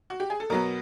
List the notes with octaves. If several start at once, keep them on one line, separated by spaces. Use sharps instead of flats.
F#4
G4
G#4
A4
B2 F#3 B3 A#4